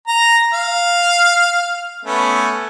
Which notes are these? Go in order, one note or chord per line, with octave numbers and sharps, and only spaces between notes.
A#5
F5
A3 B3 C#4